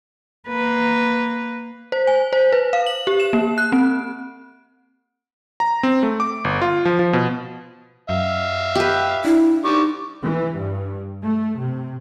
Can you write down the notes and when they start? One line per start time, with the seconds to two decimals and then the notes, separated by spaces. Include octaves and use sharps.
0.48 A#3 B4
1.92 C5
2.07 G#5
2.33 C5
2.52 B4
2.73 F5
2.86 F#7
3.07 G4
3.20 E7
3.33 A#3
3.58 F#6
3.72 C4
5.60 A#5
5.83 C4
6.03 A3
6.20 D6
6.44 G1
6.62 F4
6.85 F3
6.99 F3
7.13 B2
8.09 F#2 E5 F5
8.75 G4 B4
9.25 D4 E4
9.65 G3 D#4 C#6 D6
10.23 E3
10.56 G2
11.23 A3
11.59 C3